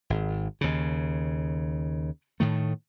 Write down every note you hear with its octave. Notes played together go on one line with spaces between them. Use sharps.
G#1
D#2 C#3
A2 D#3 A3